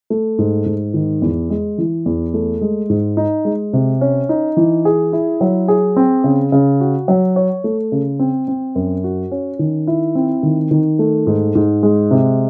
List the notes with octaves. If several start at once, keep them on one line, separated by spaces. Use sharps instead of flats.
A3
G#2
G#2
D#3
E2
G#3
E3
E2
A3
G#3
G#2
D#4
G#3
C3
C#4
D#4
E3
G#4
E4
F#3
G#4
C4
C#3
C#3
F#4
F#3
C#5
A3
C#3
C4
C4
F#2
F#4
C#4
D#3
E4
C4
D#3
D#3
A3
G#2
G#2
G#3
C3